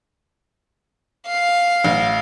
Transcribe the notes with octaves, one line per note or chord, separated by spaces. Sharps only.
F5
A1